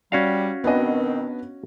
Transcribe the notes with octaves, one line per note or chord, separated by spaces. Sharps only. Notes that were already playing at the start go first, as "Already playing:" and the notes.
G3 C#4 F#4 F5
B2 D#3 B3 C4 D4 D#5